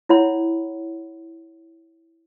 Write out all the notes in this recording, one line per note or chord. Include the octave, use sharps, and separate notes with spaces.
E4 C#5 F#5 B5